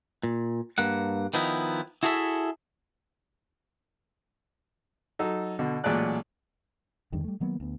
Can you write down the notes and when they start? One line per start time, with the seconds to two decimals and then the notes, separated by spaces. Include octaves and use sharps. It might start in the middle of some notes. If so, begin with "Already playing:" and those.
0.23 A#2
0.78 G2 A#3 F#5
1.34 D#3 F3 B3 D#4 E4
2.03 E4 F#4 G#4 A4 C#5 E5
5.19 F#3 D#4 A4
5.59 B2 D3
5.84 A1 A#2 F#3 G#3 D5 F#6
7.12 E2 G2 D3 D#3
7.24 G3 A3
7.40 D#3 F#3 A#3 B3
7.60 D2 B3